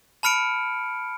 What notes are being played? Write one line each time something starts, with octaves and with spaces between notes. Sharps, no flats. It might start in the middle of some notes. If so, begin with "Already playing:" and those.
A5 B5 F6 C#7 D7